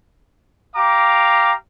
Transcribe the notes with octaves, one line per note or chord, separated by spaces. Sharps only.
G4 F5 A#5 D6